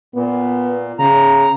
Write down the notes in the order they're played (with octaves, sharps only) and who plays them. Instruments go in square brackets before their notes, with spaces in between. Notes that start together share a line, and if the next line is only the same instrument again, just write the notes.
[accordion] A#2 [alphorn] B3
[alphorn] C#3 [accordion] A#5